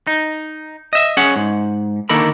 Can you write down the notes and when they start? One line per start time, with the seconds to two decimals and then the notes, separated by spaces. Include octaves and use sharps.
0.07 D#4
0.93 D#5 E5
1.17 C#4 G#4 F#5
1.36 G#2
2.09 D3 D#3 A#3 A4 A#4 B5